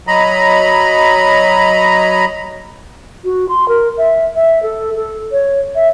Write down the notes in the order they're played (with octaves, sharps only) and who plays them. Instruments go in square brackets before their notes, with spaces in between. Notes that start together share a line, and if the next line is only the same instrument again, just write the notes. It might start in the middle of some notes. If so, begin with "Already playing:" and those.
[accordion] F#3 D#5 A#5 B5
[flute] F#4
C6
A#4
E5
E5
A4
A4
C#5
E5